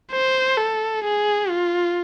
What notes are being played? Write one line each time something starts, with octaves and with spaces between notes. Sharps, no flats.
C5
A4
G#4
F4